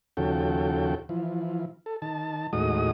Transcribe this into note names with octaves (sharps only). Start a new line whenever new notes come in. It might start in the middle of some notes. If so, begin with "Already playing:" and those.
D#2 C#3 F3 F#4 A4 G5
E3 F3
A4
D#3 A5
D#2 A2 G#3 F#4 D#5 D#6